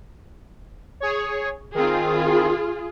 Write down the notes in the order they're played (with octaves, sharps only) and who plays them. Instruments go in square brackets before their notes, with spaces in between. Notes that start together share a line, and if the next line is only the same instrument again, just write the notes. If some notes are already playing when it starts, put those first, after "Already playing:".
[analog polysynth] G#4 C#5
[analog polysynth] D#3 C4 [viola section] F4 G#4